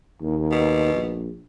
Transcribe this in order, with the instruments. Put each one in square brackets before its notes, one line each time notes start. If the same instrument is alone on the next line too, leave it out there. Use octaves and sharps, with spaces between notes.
[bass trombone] D#2
[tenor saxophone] B2
[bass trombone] A#1